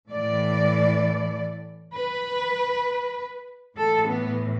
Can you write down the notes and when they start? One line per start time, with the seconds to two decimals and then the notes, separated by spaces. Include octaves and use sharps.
0.11 A2 E3 D5
1.94 B4
3.77 A2 E3 A4
4.07 B3